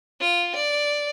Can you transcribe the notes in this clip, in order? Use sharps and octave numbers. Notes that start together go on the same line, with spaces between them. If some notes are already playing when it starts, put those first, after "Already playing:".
F4
D5